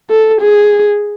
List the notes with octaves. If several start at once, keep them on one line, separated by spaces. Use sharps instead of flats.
A4
G#4